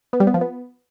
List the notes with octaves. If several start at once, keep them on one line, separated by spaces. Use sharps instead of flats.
B3
G3
B3
F3
B3